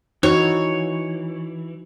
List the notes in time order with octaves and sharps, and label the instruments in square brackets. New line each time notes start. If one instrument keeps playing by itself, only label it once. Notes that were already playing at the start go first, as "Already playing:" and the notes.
[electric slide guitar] E3 [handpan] D#4 F#4 [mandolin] C#5